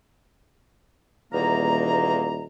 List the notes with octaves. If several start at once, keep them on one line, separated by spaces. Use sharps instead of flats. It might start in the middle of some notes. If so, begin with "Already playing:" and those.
D#1 E2 A#3 A#5